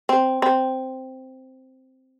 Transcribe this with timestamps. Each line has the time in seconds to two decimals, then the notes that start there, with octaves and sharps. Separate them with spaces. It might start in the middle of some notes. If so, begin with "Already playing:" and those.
0.09 C4
0.42 C4